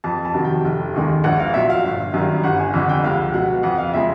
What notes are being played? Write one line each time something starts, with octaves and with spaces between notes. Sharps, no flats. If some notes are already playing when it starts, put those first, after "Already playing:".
F2 A5
A5
C3 D#3 F#3
G5
F1
D#2 D#3 G#3
A#1 F#5
F5
A#2 F#3 E5
F5
G1
F#2 D#3 G3
G1 F#5
G#5
F2 D3 G3 F#5
G5
C#2 F5
B2 F#3 F#5
F2 F#5
F5
C#3 F3 G#3 E5